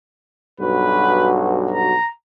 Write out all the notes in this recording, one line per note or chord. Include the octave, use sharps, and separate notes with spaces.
B1 G2 F#4 B4
A#5